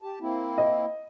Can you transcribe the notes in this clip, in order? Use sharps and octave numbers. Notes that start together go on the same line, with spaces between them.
G4 A5
A#3 C4 E4
D#5